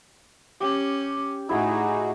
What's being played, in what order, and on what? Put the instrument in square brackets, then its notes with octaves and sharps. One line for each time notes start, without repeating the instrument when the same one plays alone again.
[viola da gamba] C#4 [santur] G4
[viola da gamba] A2 [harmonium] D#4 F#4 G#4 [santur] E4